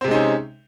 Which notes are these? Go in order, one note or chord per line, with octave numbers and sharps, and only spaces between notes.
C3 G#3 C4 C#4 D#4